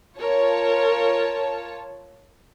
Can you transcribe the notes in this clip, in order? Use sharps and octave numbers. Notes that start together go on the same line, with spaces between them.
F4 A#4 C#5 A5